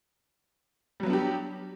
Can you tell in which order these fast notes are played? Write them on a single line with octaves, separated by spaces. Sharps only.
G3 F#3 B3 D4 G4